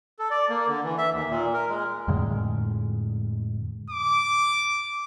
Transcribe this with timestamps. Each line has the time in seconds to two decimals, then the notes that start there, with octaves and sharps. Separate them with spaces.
0.19 A4
0.30 D5
0.49 A#3
0.68 D3
0.84 E3
0.98 E5
1.13 D#2
1.30 A#2
1.54 A#4
1.69 G#3
2.08 F2 A2 D3 G#3
3.90 D6